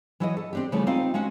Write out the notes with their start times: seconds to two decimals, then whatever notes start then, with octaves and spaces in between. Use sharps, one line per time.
0.20 E3 F#3 E4 B4 D5 D#5
0.37 A4
0.53 C4 D4 G4
0.72 C#3 E3 F3 G3 A3 C#4
0.87 C4 D#4 F4 D#5 F5
1.14 G#3 C#4 F#4 F#5